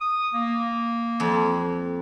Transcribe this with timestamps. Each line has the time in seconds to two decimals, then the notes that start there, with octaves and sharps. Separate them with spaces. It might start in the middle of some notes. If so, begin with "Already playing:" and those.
0.01 D#6
0.34 A#3
1.20 F2